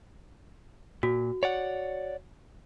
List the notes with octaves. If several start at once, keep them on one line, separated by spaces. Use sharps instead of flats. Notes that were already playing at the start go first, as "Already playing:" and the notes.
A#2 F#4
C#5 D5 F#5